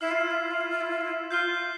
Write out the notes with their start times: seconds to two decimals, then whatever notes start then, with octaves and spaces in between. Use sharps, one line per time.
0.01 E4 F6 C7 E7
0.11 F4
0.21 E4
0.31 F4
0.41 E4
0.51 F4
0.61 E4
0.71 F4
0.81 E4
0.91 F4
1.01 E4
1.30 F4 G6 C7 G7